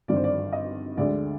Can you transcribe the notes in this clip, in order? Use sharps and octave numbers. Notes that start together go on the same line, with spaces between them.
G#1 G2 D3 D5
C5
D5
D#5
D2 D3 G#3 D5